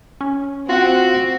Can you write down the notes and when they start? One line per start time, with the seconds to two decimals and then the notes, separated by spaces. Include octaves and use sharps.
0.21 C#4
0.69 C4 F4 F#4 F#5